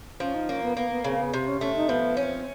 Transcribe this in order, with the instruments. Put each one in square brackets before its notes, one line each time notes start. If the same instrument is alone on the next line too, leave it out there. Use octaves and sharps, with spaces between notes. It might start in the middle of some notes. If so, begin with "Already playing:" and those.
[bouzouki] F3 [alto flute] C#4
[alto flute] D#4
[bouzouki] A#3 [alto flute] C#4
[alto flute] B3
[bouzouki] A#3 [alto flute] B3
[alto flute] B3
[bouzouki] C#3 [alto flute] C4
[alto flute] B3
[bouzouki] C3 [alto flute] C4
[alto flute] C#4
[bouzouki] A3 [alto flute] C#4
[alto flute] D#4
[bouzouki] F3 [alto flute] B3
[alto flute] C4 [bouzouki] C#4